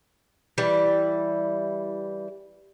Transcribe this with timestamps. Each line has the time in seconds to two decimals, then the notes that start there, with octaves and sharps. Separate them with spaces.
0.58 E3 G3